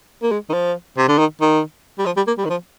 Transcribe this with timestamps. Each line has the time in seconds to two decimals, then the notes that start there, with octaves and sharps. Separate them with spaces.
0.23 A#3
0.32 G#3
0.49 D#3
0.54 F3
0.98 C3
1.09 D3
1.19 D#3
1.41 D#3
1.98 G3
2.06 F3
2.17 G3
2.28 A#3
2.38 G3
2.45 D#3
2.50 F3